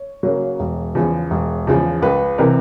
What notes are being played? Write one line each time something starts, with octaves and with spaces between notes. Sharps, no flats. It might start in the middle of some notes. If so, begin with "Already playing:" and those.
Already playing: C#5
C#3 F#3 A#3
E1
E2 C#3 F3
E1
E2 C#3 F3
C#2 B4
C3 E3 A#4